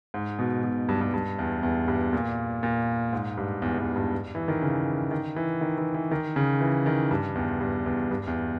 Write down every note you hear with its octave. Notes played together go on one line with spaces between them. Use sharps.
G#2
B2
B2
G2
G2
G2
E2
E2
G2
A#2
A#2
G#2
G2
E2
E2
G2
E3
D#3
C#3
D#3
E3
D#3
E3
E3
D#3
C#3
E3
D#3
G2
E2
G2
E2
G2
E2